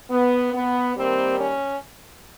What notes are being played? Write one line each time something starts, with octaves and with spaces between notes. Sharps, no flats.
B3
B3
D#3 G3 A#3 C4
C#4